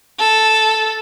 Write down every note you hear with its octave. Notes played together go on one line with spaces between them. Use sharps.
A4